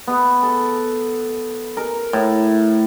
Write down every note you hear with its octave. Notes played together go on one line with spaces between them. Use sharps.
B3
A4
A#4
A2